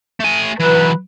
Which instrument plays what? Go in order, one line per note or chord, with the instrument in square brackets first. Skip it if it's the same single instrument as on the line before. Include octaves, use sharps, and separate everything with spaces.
[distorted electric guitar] A3 G#5
[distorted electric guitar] E3 F#3 [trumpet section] B4